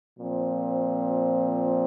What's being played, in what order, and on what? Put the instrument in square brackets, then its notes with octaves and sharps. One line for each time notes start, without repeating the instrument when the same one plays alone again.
[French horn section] A#2 F3 C4